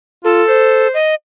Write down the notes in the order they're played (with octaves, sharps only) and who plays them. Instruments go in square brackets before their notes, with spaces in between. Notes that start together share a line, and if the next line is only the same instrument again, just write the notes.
[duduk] F4 [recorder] A4
[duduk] C5
[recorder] D#5